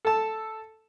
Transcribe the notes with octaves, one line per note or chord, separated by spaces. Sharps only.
A4 A5